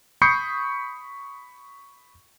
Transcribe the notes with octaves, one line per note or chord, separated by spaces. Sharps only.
B5 C#6 D#6 G6 C7 C#7